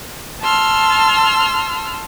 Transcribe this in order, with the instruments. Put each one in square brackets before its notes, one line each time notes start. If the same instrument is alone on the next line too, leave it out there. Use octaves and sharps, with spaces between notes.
[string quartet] A5 C6 E6 F6